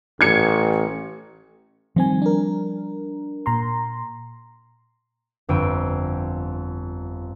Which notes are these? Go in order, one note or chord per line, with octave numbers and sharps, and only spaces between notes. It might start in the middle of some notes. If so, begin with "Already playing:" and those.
A1 G#6 C#7
D#3 F3 G3 C4 G#5
D4 A#4
A#2 A#5 C6
G1 F2 G5 D7 D#7